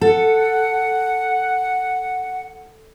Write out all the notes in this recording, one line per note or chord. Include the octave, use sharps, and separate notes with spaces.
A4 F#5